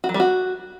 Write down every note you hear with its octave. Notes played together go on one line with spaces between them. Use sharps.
F#4
F#3
G3
F#4